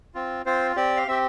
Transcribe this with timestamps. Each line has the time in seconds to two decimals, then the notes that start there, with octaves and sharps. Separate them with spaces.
0.15 C4 F4
0.46 C4 F4 C5
0.76 C4 G4 D5
0.97 F5
1.07 C4 G4 E5